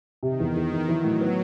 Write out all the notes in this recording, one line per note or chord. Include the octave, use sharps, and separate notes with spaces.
C3 D#3
E2
E2
E2
E3 F#3
A2
B3